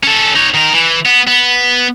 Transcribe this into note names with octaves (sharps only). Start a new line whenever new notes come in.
C#4 A4
D#4 C#5
D#3 A#4
E3
B3
B3